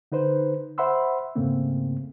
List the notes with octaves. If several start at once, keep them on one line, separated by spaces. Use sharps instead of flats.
D3 D#4 B4 C5
C5 E5 F#5 B5 C6 E6
E2 G#2 C#3 A3 A#3 C4